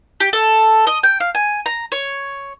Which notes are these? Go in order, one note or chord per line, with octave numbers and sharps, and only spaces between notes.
G4
A4
D#5
G5
F5
G#5
A#5
C#5